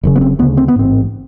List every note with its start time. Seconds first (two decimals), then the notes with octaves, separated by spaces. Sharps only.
0.03 F#1 F#2 C#3
0.16 B3
0.21 C4
0.39 D2 B3
0.42 C#3
0.57 C4
0.68 B3
0.76 A1 G#2 C4